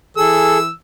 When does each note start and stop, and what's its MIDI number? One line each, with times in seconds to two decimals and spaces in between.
0.17 0.70 52
0.17 0.58 68
0.17 0.58 69
0.17 0.70 88